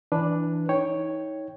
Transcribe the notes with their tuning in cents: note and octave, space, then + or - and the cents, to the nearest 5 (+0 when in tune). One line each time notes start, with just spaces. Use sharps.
E3 +0 D4 +0 B4 +0
D#4 +30 C#5 +0 G5 +0